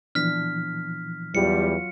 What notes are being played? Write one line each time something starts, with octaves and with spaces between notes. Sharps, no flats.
A#2 E3 F3 B3 D4 F6 B6
E2 F#3 G3 F4 F#4 C#7